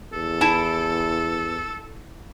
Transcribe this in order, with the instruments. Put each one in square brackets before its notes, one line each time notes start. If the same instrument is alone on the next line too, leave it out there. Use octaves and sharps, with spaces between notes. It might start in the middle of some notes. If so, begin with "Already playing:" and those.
[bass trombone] E2 [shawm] A4
[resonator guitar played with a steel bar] E4 A5